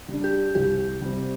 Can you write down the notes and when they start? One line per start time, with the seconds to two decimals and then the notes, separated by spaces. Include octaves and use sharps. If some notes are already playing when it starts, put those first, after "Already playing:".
0.08 G3 D4
0.24 G4
0.55 C2 G4
1.02 C3 G3